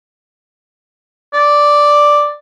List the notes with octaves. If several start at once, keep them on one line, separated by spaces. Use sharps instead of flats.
D5